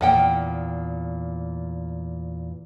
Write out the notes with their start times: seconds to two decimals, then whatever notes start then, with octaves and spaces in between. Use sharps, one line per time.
0.01 E2 A#2 F3 F#5 G5